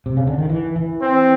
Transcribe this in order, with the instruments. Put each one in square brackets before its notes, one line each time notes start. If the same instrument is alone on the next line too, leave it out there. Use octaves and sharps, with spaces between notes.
[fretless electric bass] C3
C#3
D3
D#3
E3
E3
[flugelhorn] C4